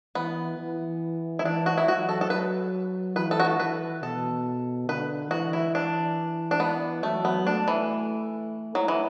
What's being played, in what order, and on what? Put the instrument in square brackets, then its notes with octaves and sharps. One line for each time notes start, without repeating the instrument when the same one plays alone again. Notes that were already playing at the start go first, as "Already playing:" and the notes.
[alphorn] E3 [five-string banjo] B3
[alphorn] E3
[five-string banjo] E4
[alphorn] E3 [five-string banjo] D4
[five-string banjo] F#4
E4
[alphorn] F#3 [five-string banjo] F#4
[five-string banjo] A4
A4
B4
[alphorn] E3 [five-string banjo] B4
[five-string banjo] A4
F#4
A4
[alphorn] E3 [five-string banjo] B4
[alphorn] B2 [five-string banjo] A4
[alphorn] D3 [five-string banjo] B4
[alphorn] E3 [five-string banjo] F#4
[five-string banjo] E4
D4
D4
B3
[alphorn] F#3 [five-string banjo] A3
[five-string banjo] B3
[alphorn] A3 [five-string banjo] D4
[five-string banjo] E3
[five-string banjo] F#3 [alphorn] E4
[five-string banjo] E3